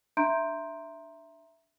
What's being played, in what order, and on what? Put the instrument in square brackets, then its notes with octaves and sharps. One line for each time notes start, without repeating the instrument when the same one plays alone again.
[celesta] D4 E5 A#5 C6 G6 D7